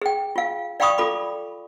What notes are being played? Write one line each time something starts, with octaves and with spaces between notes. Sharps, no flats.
G#4 G5
F4 F5
D5 F5 G5 B5 C#6 D#6
F4 A4 B5 D6